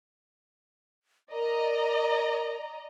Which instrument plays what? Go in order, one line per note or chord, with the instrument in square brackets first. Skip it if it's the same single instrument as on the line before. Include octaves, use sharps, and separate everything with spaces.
[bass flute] A#4 [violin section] D5 D#5 A#5